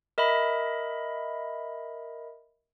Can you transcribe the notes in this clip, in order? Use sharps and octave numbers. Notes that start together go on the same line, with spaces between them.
A#4 D#5 E5 B5